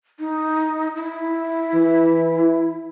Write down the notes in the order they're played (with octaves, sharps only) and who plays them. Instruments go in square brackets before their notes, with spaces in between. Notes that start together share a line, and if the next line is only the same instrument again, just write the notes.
[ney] D#4
E4
[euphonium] E3